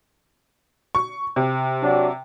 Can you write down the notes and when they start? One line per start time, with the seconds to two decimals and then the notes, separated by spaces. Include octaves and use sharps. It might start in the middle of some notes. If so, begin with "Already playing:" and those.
0.95 C#6
1.36 C3
1.81 F#3 D4